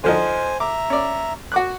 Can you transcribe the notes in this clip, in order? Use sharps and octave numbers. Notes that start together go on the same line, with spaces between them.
D3 F3 D#4 C5 G#5
E5 A#5 D6
C#4 D5
F#4 D6 F#6